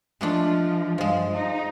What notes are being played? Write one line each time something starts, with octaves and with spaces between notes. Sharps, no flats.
F3 G#3 A3 D4
G2 F3 G#3
D#4